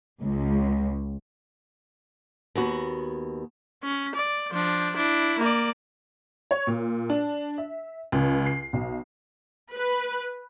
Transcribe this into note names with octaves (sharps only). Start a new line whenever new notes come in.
C#2
D#2 B3 F#4
C#4
D5
F3 D4
D4 E4
A#3 D5
C#5
A#2
D4
E5
C#2
C7
B1
B4